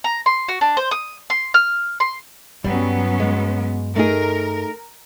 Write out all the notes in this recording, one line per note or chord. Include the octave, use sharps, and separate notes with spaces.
A#5
C6
F#4
D4
C5
D#6
C6
F6
C6
G2 F#3 G3 B3 C#4
G#3
A3 D#4 G#4 A#4